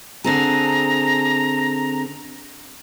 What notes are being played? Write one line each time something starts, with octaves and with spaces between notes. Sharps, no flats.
D3 C4 G#4 A#5